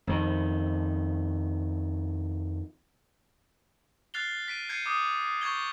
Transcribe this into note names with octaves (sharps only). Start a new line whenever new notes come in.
F2 D#3
F6 F#6 A6 C7 F7 G7
B6 D7 D#7
G6 G#6 C7 C#7 D#7
D6 D#6 G6
D#6
C#6 G6 G#6 G7